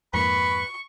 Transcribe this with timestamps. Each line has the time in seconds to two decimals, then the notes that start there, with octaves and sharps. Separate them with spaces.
0.14 F2 G#2 A#3 B4 B5 C#6